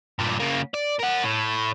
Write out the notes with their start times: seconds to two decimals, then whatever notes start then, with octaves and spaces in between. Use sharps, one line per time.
0.19 G2 A#2
0.40 C#3 A#3
0.74 D5
0.99 A#4 F#5
1.23 A2